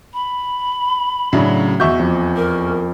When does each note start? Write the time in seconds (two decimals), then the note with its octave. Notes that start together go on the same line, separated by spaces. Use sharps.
0.14 B5
1.33 A2 C#3 F#3 C#4 D4 F#4
1.80 E2 F#4 D#5 E5 C#6 G6
1.99 F2
2.36 A#4